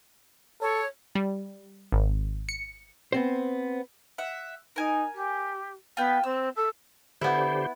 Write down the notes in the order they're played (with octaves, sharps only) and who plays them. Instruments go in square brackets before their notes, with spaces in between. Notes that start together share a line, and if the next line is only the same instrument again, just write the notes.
[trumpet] A4 [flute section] C#5
[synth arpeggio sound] G3
G#1
C#7
[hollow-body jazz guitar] B3 C4 C5
[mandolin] E5 F#5
[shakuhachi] D#4 [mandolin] A#4 G#5
[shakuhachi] G4
[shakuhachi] B3 [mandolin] F4 G5
[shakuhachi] C4 [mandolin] E6
[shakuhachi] A4
[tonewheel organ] D3 G4 C5 [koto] B3 E4